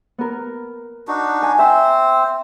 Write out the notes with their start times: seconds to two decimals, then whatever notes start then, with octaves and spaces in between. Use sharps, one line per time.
0.18 B3 A#4
1.08 D4 D#4 F#4
1.42 G#5
1.59 C4 C5 E5